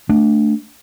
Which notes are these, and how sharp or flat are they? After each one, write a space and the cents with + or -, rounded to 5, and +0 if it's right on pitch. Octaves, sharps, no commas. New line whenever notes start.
A3 +0 D4 +0